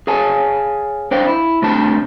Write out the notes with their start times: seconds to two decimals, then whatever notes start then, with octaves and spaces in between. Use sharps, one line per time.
0.07 G#4 C#5 F5 G#5 A5
1.11 D4 C5 D5 F5 G5
1.28 E4
1.62 C3 A3 D4 G4 A5